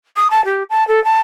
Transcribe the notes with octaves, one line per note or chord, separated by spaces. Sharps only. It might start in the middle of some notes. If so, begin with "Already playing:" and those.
D#6
A5
G4
A5
A4
A5